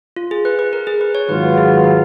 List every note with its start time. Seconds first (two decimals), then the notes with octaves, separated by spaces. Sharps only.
0.16 F4
0.31 G#4
0.45 B4
0.59 B4
0.73 A#4
0.87 G#4
1.01 B4
1.15 C#5
1.28 G#2 D#3 F#3 B3 F4 B4
1.57 G#4
1.84 D#4